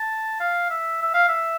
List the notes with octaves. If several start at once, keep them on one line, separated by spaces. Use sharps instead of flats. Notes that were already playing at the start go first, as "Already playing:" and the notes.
Already playing: A5
F5
E5
E5
F5
E5